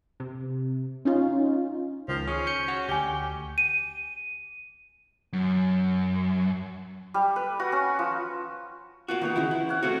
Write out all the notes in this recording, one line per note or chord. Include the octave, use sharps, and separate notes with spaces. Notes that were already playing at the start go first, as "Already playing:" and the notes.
C3
C#4 D#4 F4
C#2 D#3 F3
C#4 G#4
G6 C#7
F#4
D2 G4 G#5 G7
D#7
F#2
G3
B4
F#4
C#4
F3
A#3 F4 F#4 F#5
D#3 B3 D#4 F4 F#4
C#3 E3 E4
E4
C#5 F5 F#5
A3 C4 F#4